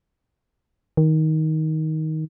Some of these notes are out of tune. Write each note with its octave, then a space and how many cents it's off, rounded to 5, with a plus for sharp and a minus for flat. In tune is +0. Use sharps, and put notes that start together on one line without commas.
D#3 +15